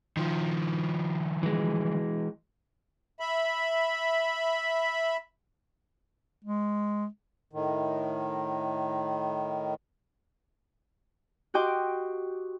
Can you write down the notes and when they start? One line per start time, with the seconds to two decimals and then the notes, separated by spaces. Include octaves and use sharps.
0.17 D#3 F3
1.43 E3 G#3
3.20 E5 B5
6.45 G#3
7.52 A2 D#3
11.54 F#4 G4 D#5 G5 C6 D6